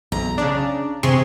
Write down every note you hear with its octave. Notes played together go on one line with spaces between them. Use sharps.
B1 A#5
C#3 D4
C3 G#4 C6 C#6